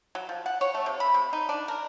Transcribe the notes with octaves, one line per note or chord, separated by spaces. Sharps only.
F#3
F3
F#5
C#5
A3
C3
B5
C3
D#4
D4
A#4